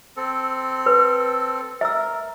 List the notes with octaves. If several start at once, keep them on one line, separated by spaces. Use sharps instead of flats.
C4 A4
B4
A#4 E5 E6